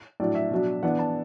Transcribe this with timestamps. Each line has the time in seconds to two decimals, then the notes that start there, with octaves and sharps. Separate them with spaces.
0.20 A2 F#3 D4 D5
0.35 E5
0.51 B2 F#3 D4
0.83 E3 B3 D4 F#5
0.99 A5